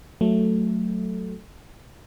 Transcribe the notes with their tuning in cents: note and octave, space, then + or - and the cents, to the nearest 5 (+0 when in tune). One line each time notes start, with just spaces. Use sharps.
F#3 +0 A3 +0